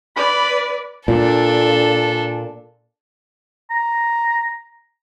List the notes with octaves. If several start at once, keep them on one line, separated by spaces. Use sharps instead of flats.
B4 D5 B5
A#2 D4 A4
A#5